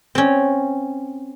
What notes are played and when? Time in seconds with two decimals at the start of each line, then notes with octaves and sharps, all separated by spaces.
0.15 C4 C#4